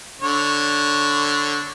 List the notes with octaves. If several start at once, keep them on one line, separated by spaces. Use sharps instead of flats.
D3 C#5